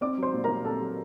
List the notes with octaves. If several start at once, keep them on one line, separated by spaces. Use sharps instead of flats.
C4 D5 D6
F#3 C5 C6
A#2
A#2 A#4 A#5
C4 A4 A5
F#3